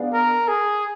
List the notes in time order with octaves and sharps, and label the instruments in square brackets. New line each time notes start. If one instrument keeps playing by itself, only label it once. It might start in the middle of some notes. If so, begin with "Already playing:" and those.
Already playing: [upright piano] B3 D4 G#4 D5 F5
[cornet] A#4
G#4